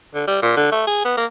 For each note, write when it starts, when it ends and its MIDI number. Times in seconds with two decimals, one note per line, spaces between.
0.14 0.27 50
0.27 0.40 55
0.42 0.55 46
0.57 0.67 50
0.71 0.85 57
0.87 1.01 68
1.04 1.15 59
1.17 1.25 58